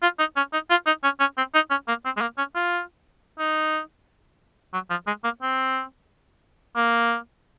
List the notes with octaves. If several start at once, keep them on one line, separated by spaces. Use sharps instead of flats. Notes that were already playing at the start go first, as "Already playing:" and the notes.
F4
D#4
C#4
D#4
F4
D#4
C#4
C#4
C4
D#4
C#4
A#3
C4
G#3
A#3
C#4
F4
D#4
F#3
F3
G#3
A#3
C4
A#3